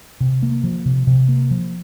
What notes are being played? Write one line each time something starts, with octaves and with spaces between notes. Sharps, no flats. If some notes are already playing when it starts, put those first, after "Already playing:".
C3
A#3
F3
C3
C3
A#3
F3